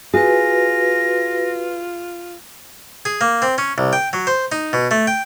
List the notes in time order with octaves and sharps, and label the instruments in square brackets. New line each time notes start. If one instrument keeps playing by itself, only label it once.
[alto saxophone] F4 [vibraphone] F#4 B4 [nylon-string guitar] G#4 [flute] A#6
[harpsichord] G#4
A#3
C4
C#4
C2
G5
F#3
C5
D#4
B2
A3
G5